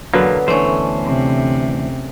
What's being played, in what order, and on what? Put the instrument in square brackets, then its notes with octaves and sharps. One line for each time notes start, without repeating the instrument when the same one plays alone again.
[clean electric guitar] E2 B2 A#3 [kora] D3 F#3 B3
[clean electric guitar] D2 E3 C5 [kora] A3 [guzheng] C#4 D4
[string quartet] C3